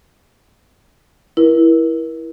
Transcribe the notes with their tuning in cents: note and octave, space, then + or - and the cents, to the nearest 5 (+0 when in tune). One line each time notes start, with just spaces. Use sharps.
E4 +0 A#4 +35